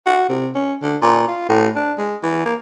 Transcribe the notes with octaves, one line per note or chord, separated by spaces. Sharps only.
F#4
C3
C#4
D3
A#2
F4
A2
D4
G#3
E3
A#3